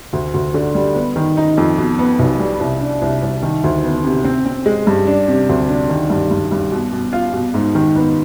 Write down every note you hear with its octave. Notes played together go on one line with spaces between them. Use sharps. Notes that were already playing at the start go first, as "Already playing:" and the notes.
D2
D2
D3
G3
B3
D#3
D#4
F2
B2
B3
B1
G3
C2
D4
C2
C2
D#3
D2
B3
C3
C4
C4
G#3
G2
D4
C3
D2
D4
D#3
G2
G2
G2
B2
B2
F4
B2
G#2
D#3
B3